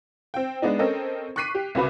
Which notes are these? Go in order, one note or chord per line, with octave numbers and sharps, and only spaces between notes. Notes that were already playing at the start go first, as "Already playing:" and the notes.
C4 G5
G#3 B3 D4 D#4
C4 C#4 A4 A#4 D#5
C#6 D6 F#6 B6 C7 D#7
G4
C2 C#3 F#4 B4 B5 D6